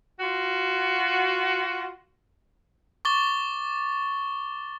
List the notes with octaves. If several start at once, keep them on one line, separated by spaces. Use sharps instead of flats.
F4 F#4
C#6 D6 A6 G7